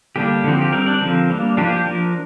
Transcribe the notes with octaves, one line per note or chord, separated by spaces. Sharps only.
D3 G3 A#3 D4 G4
D3 F3 C4
G4
G3 C4 A#4
D4 D5
D3 F3 C4 A#4
G3 A#3 D4
F3 A#3 D4 G4
G4
F3 D4 A#4